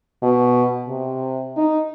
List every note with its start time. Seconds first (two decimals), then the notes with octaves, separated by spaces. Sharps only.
0.22 B2
0.87 C3
1.56 D#4